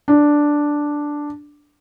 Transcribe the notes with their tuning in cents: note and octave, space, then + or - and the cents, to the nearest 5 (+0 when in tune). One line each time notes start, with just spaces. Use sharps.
D4 +0